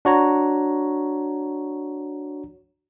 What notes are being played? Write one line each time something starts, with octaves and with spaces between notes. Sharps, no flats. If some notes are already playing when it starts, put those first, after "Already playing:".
D4 F#4 C#5 A#5